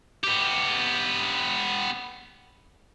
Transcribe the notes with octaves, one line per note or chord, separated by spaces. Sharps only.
B3 G4